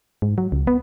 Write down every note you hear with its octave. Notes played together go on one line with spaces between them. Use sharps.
G#2
F#3
C#2
B3